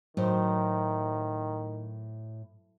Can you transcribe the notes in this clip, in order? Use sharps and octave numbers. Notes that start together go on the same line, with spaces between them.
A2 D#3 F#3 C5